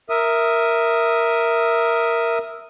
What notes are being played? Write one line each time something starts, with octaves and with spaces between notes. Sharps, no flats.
A#4 E5 D#6